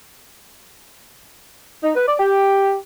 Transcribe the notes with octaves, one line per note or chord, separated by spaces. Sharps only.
D#4
B4
D5
G4